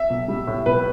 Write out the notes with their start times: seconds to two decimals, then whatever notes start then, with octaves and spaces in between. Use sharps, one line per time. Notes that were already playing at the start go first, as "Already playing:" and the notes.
Already playing: E5
0.10 B1
0.28 G3
0.47 A2
0.66 B1 B4